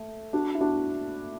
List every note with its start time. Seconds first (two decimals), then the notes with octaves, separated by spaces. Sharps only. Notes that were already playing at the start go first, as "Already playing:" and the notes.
Already playing: A3
0.33 D4 F#4
0.55 E4
0.61 D4 F#4